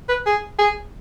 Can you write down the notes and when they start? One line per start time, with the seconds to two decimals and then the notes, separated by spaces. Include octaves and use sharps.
0.09 B4
0.26 G#4
0.59 G#4